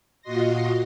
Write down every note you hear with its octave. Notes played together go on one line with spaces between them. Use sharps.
A#2 F4 F#4 D#5 C6 A#6